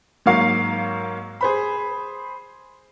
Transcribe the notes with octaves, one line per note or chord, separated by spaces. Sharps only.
G#2 F#3 A#3 F5 C#6
G#4 C5 B5